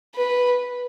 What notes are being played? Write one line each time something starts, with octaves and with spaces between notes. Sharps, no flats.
B4